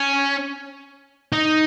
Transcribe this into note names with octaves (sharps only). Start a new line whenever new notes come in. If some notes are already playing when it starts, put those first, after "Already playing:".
Already playing: C#4
D#4